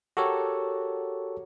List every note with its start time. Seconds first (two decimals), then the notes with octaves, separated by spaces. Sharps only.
0.17 F#4 G4 A4 A#4 C#5